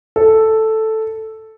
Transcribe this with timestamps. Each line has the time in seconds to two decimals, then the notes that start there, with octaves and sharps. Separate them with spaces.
0.16 A4